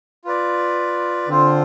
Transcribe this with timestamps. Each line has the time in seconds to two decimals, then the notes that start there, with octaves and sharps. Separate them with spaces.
0.25 F4 B4 D5
1.28 D3 C4 F4 C5